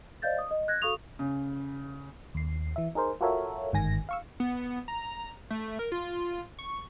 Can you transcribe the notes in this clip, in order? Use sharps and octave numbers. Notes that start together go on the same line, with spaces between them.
C5 D5 D#5 F5 G6 A6
D#6
D#5
F#6 G#6 A#6
F#4 A4 F5 C#6 D#6 F7
C#3
D#2 C7
E3 E5
D#4 G#4 A#4 C5
F4 F#4 A4 A#4 C#5 E5
G1 G#2 D#3 G#5 A#6
F5 C#6 E6
B3
A#5
A3
A#4
F4
C#6